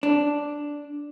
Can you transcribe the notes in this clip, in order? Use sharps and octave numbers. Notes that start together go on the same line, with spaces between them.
D4